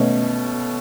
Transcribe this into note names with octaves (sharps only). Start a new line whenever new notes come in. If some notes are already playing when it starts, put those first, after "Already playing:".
Already playing: B2 A3 C#4